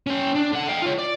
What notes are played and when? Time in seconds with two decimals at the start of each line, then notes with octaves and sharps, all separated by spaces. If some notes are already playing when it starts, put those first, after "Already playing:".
0.07 C#4 G5
0.35 D4
0.53 D3 F#5
0.69 F5 G5
0.83 F4 C#5
0.99 D5